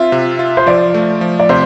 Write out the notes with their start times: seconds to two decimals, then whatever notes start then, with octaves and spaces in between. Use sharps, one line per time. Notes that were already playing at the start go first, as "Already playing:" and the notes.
Already playing: C4 F4 E5
0.12 C3
0.39 F4
0.57 C5
0.66 F3 D5
0.94 A3
1.21 F3
1.39 D5
1.49 C3 C5